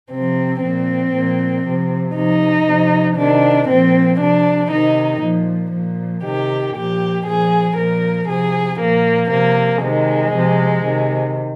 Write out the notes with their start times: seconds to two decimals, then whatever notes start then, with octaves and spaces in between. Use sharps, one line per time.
0.11 C3 F3 C4
0.62 A#2 F3 C4
1.13 A#2 F3
1.65 C3 F3
2.15 C3 F3 D#4
2.67 C3 F3
3.17 C3 D#3 D4
3.69 A#2 F3 C4
4.20 C3 F3 D4
4.71 C3 D#3 D#4
5.22 A#2 F3
5.73 A#2 F3
6.24 C3 D#3 G4
6.75 A#2 F3 G4
7.26 A#2 F3 G#4
7.77 A#2 F3 A#4
8.29 C3 F3 G#4
8.80 A#2 F3 A#3
9.30 C3 F3 A#3
9.82 C3 D#3 G#3
10.33 C3 F3
10.84 C3 D#3